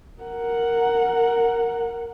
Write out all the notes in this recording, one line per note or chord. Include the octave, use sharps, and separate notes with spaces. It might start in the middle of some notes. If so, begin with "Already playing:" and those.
A#4 F#5